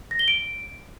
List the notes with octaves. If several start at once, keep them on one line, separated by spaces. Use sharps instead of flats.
A#6
G7
D7